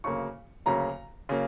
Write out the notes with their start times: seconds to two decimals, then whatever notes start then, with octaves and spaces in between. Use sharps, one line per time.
0.04 D2 C#3 F#3 A#3 C#6
0.66 D2 C#3 F#3 A#3 A#5
1.29 C#3 F#3 A#3